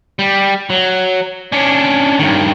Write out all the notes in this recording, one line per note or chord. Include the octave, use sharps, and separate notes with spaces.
G3
F#3
C#4 D4
G2 D#3